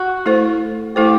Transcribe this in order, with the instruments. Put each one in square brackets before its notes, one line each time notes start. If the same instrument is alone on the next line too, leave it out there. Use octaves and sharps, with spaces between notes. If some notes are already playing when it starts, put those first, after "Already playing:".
Already playing: [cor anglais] F#4
[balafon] A3 E4 A4 C5
[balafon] A3 E4 A4 C5 [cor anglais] G4